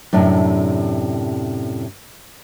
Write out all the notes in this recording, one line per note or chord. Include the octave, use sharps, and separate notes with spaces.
F#2 A2 C3 D4